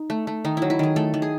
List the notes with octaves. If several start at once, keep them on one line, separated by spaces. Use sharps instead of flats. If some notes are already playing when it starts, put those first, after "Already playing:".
Already playing: D#4
A3
A3
D#3 D#4
F#3 E4
E4
D#3 G#4
A3 A4
D#3
G#4